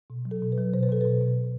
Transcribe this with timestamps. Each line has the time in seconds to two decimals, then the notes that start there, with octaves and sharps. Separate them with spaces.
0.10 B2
0.25 F#3
0.31 A4
0.42 B2
0.52 B4
0.58 F#3
0.74 B2 C5
0.83 B4
0.89 B2 A4
1.01 B2 B4
1.21 B2